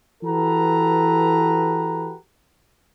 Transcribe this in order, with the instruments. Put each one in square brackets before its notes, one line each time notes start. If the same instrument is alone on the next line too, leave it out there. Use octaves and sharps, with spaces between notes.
[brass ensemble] E3 F#4 G4 A4 B4 A#5